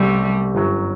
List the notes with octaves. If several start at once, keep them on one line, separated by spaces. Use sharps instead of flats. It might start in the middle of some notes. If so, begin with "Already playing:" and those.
Already playing: C2 B2 G3 A3 C4 F#4
G1 F#2 F#3